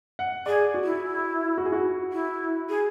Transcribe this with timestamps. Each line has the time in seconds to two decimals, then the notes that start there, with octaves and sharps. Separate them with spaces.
0.19 F#5
0.46 G#4 D5
0.74 F#4
0.84 E4
1.58 F#4
1.65 G#4
1.72 F#4
2.12 E4
2.69 G#4